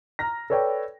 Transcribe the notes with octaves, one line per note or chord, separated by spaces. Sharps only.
A#5 F6 A#6
A4 B4 C#5 D5 G5